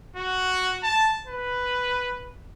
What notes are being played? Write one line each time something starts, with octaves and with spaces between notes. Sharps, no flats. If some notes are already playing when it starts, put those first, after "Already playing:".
F#4
A5
B4